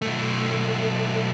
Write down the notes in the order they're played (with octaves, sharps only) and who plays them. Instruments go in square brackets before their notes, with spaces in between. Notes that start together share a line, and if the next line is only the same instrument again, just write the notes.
[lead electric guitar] B1 A3